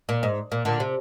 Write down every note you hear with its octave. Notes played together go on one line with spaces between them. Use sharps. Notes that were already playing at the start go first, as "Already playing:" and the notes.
A#2
G#2
A#2
A#2 D3
C3